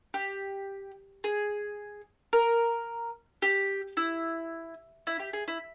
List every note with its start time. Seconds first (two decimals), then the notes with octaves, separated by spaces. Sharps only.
0.14 G4
1.24 G#4
2.33 A#4
3.42 G4
3.97 E4
5.07 E4
5.19 G4
5.33 G#4
5.48 E4